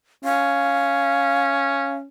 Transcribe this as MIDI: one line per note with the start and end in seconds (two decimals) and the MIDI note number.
0.25 2.06 61
0.25 1.96 77